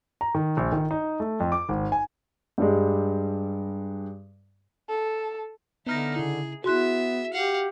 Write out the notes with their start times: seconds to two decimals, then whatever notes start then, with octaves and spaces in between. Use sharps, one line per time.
0.21 A#5
0.35 D#3
0.57 A#1
0.72 D#3
0.91 D#4
1.20 A3
1.40 F2
1.52 D6
1.69 G#1
1.92 G#5
2.58 G2 G3 G#3
4.89 A4
5.87 D3 B3 D#4 E4 F6 A#6
6.16 C#3 E4 G#4
6.64 B3 E4 F#4 G#4 E5 C6 F#6
7.33 G4 F5 F#5